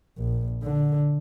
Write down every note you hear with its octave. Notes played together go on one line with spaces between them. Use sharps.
A#1
D3